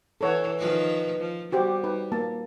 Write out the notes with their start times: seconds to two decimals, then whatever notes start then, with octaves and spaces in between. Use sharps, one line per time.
0.21 E3 A4 C#5 F#5
0.59 D#3 F3 B4
1.20 F3
1.52 G3 F#4 G4 C5
1.84 D#4 B4
2.12 A#3 A5